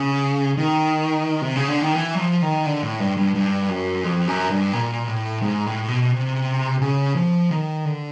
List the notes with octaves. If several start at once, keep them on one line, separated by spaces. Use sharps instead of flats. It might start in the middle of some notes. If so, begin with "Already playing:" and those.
Already playing: C#3
D#3
C3
C#3
D3
D#3
E3
F#3
F3
D#3
D3
A2
G2
G2
G2
F#2
F2
F#2
G2
A#2
A2
G#2
A2
B2
C3
C#3
F3
D#3
D3